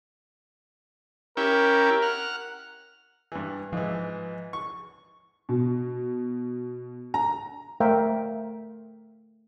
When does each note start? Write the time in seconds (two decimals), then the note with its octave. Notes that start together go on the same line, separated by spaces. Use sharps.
1.37 C#4 E4 G4 A#4
2.02 F#5 F6
3.32 G2 E3
3.73 G#2 E3 F3
4.53 C#6
5.49 B2
7.14 A#5
7.80 A3 A#4 C5 E5 F5 G5